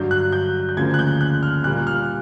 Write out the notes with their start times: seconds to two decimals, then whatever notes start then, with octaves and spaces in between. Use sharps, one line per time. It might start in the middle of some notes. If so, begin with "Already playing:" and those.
Already playing: G2 D3 F#3 G6
0.11 F#6
0.33 G6
0.69 G6
0.77 D2 C#3 F3 A#3 G#6
0.94 F#6
0.99 G6
1.21 F#6
1.43 F6
1.64 A#2 G3 A#3 F#6
1.87 F6